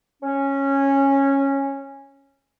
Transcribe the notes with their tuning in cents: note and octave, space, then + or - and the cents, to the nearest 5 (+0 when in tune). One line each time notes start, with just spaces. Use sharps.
C#4 -10